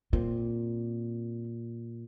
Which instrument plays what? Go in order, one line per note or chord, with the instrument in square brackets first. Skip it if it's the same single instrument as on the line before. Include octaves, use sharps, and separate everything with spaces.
[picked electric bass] A#2 [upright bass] C4